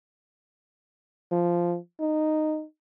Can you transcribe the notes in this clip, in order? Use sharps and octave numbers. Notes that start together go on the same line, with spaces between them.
F3
D#4